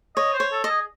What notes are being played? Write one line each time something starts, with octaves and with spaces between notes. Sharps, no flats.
C#5 D#5
C5
C#5
A4
A4 D#5
G#4